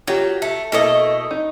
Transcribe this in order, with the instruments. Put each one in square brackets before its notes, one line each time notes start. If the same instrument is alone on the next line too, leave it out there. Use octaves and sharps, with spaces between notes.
[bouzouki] F#3 [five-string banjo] F4 G4
[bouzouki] A3
[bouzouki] B2 A3 D#5 [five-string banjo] A#3 E4 A4
[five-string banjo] D#4